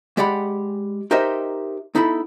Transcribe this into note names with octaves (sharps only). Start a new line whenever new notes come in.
G#3 G4 D5 F#5 B5
D#4 G4 A#4 C5 D#5 E5
B3 D#4 E4 A4 B5